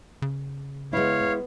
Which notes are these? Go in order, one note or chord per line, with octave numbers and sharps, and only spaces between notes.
C#3
G#3 B3 E4 C#5 F5